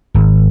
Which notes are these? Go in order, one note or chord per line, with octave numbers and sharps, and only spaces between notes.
G#1